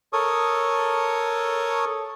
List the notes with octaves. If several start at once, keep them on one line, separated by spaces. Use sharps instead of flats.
A4 A#4 C#5 C#6 D#6